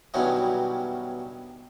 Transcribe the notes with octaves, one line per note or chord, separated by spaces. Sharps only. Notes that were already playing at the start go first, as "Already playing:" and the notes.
G2 B2 D#3 F#3 C#4 E4